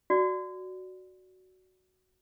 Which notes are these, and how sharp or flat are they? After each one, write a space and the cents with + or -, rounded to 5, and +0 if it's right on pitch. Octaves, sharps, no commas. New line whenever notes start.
F#4 +0 D5 +0